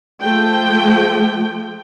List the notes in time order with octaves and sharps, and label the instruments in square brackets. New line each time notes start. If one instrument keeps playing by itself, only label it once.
[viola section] F3 A3 G5